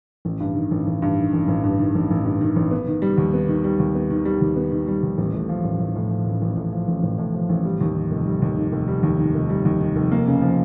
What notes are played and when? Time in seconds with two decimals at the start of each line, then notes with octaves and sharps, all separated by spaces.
0.25 A1
0.40 G2
0.55 D#3
0.71 A1
0.87 A1
1.02 G2
1.18 D#3
1.33 A1
1.48 A1
1.64 G2
1.79 D#3
1.95 A1
2.10 A1
2.25 G2
2.41 D#3
2.56 A1
2.71 B3
2.87 D#3
3.02 G3
3.18 D#2
3.33 B3
3.48 D#3
3.64 G3
3.79 D#2
3.95 B3
4.10 D#3
4.25 G3
4.42 D#2
4.56 B3
4.72 D#3
4.88 G3
5.03 D#2
5.18 A1
5.33 A2
5.49 F3
5.64 A1
5.80 A1
5.95 A2
6.11 F3
6.27 A1
6.42 A1
6.57 A2
6.72 F3
6.88 A1
7.03 A1
7.18 A2
7.34 F3
7.49 A1
7.65 G3
7.81 D#2
7.96 D#3
8.11 F1
8.26 G3
8.42 D#2
8.58 D#3
8.72 F1
8.88 G3
9.03 D#2
9.19 D#3
9.35 F1
9.50 G3
9.65 D#2
9.81 D#3
9.96 F1
10.11 A#3
10.27 C#3
10.42 F3